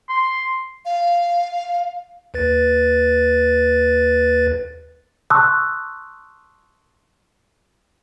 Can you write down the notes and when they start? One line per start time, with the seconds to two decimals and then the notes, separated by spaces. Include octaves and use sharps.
0.09 C6
0.85 F5
2.34 D#2 B4 A6
5.30 A5 C6 C#6 D#6 E6 F#6